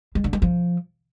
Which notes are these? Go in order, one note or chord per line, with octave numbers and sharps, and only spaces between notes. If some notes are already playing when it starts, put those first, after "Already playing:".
G#3
D3
G#3
F3